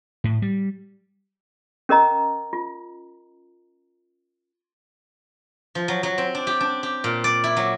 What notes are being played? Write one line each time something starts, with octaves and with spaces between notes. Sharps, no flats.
A2
G3
C#4 A#4 D#5 A#5
F4
F3
F#3
F#3
C4
D4
G4
D4
G4
A#2
D5
E4
F#3